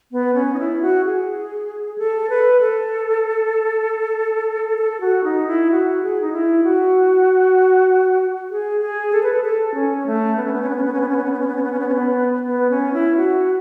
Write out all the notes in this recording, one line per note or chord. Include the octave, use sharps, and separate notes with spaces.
B3
C#4
D#4
E4
F#4
G#4
A4
B4
A4
A4
F#4
D#4
E4
F#4
G#4
D#4
E4
F#4
G#4
G#4
A4
B4
A4
A4
C#4
A3
B3
C#4
B3
C#4
B3
C#4
B3
C#4
B3
C#4
B3
C#4
B3
C#4
B3
C#4
B3
C#4
B3
C#4
B3
B3
C#4
E4
F#4